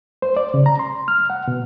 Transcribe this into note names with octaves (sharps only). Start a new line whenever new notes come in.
C5
D5
C#3
A#5
C6
F6
F#5
B2